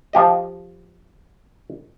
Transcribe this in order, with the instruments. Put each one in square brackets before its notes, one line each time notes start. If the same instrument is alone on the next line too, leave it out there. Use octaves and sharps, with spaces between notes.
[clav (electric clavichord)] F3 G4 D#5